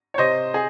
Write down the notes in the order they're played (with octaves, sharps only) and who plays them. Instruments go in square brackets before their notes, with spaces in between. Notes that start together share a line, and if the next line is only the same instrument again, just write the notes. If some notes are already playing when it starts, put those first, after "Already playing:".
[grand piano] C#5
C3 C5 D#5
G#4